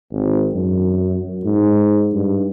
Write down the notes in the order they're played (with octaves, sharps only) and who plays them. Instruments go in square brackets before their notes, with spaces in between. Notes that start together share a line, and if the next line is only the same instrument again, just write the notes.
[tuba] G#1
F#2
G#2
G2